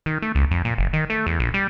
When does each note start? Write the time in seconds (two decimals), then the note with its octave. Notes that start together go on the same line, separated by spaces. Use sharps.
0.06 D#3
0.22 A3
0.35 C#2
0.51 F2
0.65 A#2
0.78 F#1
0.93 D#3
1.10 A3
1.27 E2
1.39 A#1
1.54 G3